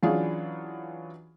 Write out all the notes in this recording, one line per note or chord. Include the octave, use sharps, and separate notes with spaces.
E3 F#3 C#4 D4 F4 G#4